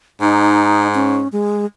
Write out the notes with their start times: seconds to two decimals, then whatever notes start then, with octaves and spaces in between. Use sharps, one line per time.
0.21 G#2 D#4
0.95 C#4
1.32 G#3